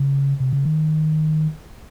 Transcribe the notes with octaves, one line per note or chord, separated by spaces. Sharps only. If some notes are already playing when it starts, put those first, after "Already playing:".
Already playing: C#3
C3
C#3
D#3